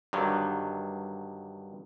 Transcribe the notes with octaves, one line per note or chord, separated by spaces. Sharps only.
G2 D3 D#3 F#3